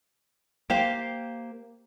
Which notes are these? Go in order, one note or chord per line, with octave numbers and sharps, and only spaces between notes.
A#3 G4 C5 F5